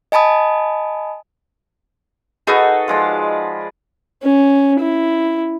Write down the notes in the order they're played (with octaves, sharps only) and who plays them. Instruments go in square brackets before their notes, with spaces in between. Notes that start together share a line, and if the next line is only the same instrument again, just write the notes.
[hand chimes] D#5 G#5 A5 B5 D#6
[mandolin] D#4 F#4 G#4 [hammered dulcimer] A4 B4 D#5
[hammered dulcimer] F3 G#3 D5
[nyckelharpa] C#4
E4